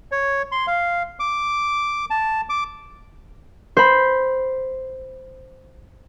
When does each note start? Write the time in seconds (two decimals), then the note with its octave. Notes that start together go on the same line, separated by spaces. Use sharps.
0.12 C#5
0.52 C6
0.67 F5
1.20 D6
2.10 A5
2.49 D6
3.77 C5 B5